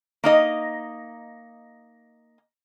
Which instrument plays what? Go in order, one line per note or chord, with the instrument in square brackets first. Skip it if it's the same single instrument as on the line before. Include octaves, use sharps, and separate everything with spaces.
[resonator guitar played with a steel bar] A#3 D#4 D#5